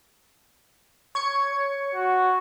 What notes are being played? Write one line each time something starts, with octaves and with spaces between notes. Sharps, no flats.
C#5 G#6 C#7
F#4